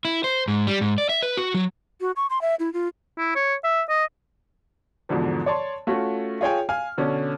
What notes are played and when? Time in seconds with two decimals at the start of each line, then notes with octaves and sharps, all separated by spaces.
0.05 E4
0.24 C5
0.48 G#2
0.67 G3
0.81 G#2
0.98 D5
1.09 E5
1.23 B4
1.37 F#4
1.54 F#3
2.01 F#4
2.16 C#6
2.30 C6
2.41 E5
2.59 E4
2.73 F4
3.18 E4
3.35 C#5
3.64 E5
3.89 D#5
5.09 E2 G#2 B2 D3 F3
5.46 C#5 D5 A5 C6
5.87 A3 C#4 F4 F#4
6.41 F4 G#4 C#5 G5 G#5
6.69 F5 G#5 F6
6.98 B2 D3 C#4